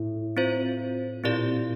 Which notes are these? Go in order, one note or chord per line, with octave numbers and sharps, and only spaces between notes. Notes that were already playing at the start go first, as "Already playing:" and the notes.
Already playing: A2
C4 F4 C5
A#2 C4 E4 G4 D5